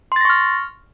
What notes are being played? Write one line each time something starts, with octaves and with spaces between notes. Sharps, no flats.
C6 C#6 F6 A6 A#6